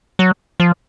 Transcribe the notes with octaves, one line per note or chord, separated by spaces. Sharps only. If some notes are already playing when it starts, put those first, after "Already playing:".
F#3
F3